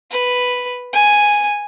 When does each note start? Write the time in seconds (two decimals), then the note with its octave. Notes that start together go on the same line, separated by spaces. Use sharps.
0.11 B4
0.93 G#5